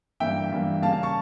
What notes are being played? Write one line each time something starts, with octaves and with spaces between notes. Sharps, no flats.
G2 E3 A#3 E5 G5
G2 E3 A#3
C#3 G3 A#3 F5 A5
F5 A5
A5 C#6